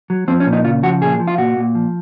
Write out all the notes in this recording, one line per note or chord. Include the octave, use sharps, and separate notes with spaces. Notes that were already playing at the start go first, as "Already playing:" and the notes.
F#3
F3 C4
C#4
A#2
D#4
C#3 F4
F3 F#4
A#2 G#4
F3
F4
A#2 F#4
A#2
F3